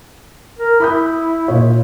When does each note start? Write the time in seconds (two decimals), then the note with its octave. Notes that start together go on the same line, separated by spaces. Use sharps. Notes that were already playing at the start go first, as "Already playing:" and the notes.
0.59 A#4
0.80 E4 B5 D#6 G6
1.48 A#2 C#5